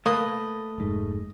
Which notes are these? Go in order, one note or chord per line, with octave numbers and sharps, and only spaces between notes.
A3 A#3 B4 D#5
F1 G#2